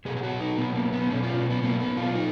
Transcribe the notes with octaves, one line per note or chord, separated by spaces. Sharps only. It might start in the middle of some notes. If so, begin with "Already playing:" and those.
B2 F#3 G#4
G#4
F#4
D#4
B2 F#3 B3
A#3
B3
B2 F#3 C#4
F4
C#4
B3
B2 F#3 A#3
B3
F4
F#3 D#4